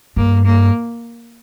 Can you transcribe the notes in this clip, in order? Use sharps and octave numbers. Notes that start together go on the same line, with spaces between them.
G2 A#3
A#3